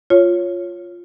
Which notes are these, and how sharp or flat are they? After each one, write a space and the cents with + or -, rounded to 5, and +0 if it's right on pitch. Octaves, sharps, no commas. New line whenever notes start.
F4 +0 C#5 -5